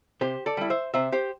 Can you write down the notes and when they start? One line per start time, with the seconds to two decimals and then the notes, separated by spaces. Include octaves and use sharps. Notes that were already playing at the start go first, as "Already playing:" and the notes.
0.21 C3 G4 C5
0.46 A4 D5
0.57 G3 E4
0.70 C5 E5
0.94 C3 C5 E5
1.12 G4 C5